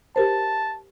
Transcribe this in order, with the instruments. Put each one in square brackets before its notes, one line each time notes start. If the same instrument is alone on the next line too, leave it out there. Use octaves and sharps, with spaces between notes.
[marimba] G4 A#4 C5 [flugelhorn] A5